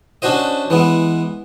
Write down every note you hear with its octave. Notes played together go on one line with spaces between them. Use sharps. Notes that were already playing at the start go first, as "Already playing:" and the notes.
C#4 D4 F#4 C5 D#5
E3 G#3 B3